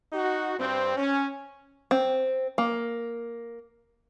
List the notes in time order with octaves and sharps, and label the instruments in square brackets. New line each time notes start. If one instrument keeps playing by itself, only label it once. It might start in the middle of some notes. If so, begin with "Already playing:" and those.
[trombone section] D#4 F#4
G2 C4
C#4
[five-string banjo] C4
A#3